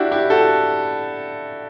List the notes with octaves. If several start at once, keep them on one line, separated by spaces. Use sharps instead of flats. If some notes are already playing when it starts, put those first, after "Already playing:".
Already playing: D4 E4 F#4 G4
E4 G4
F#4 A4